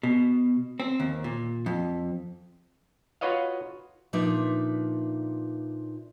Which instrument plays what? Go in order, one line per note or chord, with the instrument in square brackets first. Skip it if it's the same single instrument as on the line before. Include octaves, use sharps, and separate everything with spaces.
[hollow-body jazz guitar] B2
C4
D#2
A#2
F2
[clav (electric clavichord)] F4 F#4 B4 C#5 D#5 F5
[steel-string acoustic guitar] A#2 F3 D4 D#4 B4 E5